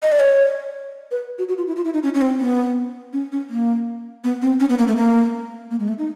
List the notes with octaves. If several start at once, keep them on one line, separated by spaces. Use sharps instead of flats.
D#5
D5
C#5
B4
F#4
F#4
F4
E4
F4
E4
D#4
C#4
C#4
C4
B3
C#4
C#4
A#3
B3
C4
C#4
B3
A#3
A3
A#3
A#3
G#3
A3
D#4